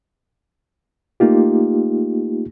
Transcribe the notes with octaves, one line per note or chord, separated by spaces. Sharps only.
A3 A#3 D#4 F4 G4